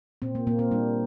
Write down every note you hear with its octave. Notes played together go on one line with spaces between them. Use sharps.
A#2 C4
A#3
A#2 A#3
C4
G3 D4